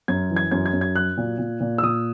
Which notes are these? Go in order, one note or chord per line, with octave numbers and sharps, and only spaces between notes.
F#2 G#6
E3
G#6
F#2 G#6
G#6
F#2
G#6
F#3 F#6
A#2
A#2
A#2
E6
A#2 D#6